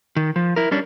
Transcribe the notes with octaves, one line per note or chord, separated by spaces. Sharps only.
D#3
F3
E4 A#4
G3 C#4 D4